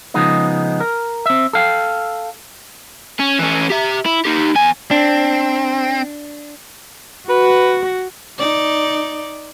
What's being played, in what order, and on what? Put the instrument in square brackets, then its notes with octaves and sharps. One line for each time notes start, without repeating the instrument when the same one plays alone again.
[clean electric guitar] C#3 F3 G#3 B3 D#4 D#5
A#4
C4 E5
A4 F5 G5
[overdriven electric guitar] C#4
E3 C#4
G4 E5
E4
D#4 G4
E2 G#5
[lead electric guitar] C4 [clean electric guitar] D4
[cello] F#4 [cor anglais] B4
[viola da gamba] D#4 D5